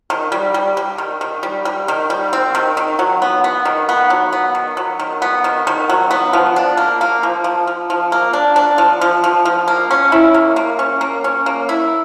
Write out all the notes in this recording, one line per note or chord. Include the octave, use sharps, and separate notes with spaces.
D#3
G3
G3
G3
D#3
D#3
G3
G3
D#3
G3
C4
D#3
D#3
F#3
B3
B3
D#3
B3
F#3
B3
D#3
F#3
D#3
B3
D#3
D#3
F#3
B3
F3
D4
A#3
A#3
F3
F3
F3
F3
A#3
D4
D4
F3
F3
F3
F3
A#3
C#4
E4
A#3
A#3
C#4
A#3
C#4
A#3
E4